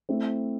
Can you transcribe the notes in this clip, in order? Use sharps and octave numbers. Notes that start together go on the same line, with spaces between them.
A3 C4 E4